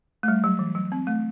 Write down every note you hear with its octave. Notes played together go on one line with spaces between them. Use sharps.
A3
G3
F#3
E3
F#3
C4
A3